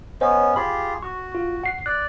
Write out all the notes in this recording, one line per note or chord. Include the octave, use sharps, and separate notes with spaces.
B3 C#4 C5 C#5 D#5
F4 G4 G#4 B5
F#4 C#6
F4
F#5 C7
D5 F#6